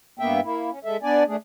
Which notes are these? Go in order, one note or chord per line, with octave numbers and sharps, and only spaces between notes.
G2 A#3 B3 E5 G5
A#3 E4
C#4
G#3 A4 E5
B3 D4 D5 G#5
A3 D4 G#4